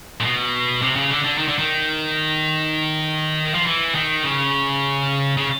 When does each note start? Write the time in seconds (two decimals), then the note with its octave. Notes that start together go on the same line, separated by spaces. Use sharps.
0.20 A#2
0.25 B2
0.82 C3
0.96 C#3
1.10 D3
1.24 D3
1.38 D#3
1.48 D3
1.59 D#3
3.54 F3
3.66 E3
3.95 D#3
4.24 C#3
5.37 C#3